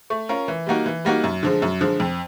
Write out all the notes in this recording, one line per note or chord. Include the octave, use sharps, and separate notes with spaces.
A3
C#4 F4 A#4
E3
G3 A#3 D#4 F#4
E3
G3 A#3 D#4 F#4
F#2
D3 F3 G#3
F#2
D3 F3 G#3
F2